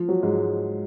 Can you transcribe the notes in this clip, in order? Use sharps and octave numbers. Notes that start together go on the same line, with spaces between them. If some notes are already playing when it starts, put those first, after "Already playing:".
Already playing: F3
F#3
G#2 G#3